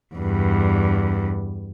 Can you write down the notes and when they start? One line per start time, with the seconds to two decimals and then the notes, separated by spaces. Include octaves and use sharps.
0.15 E2 G2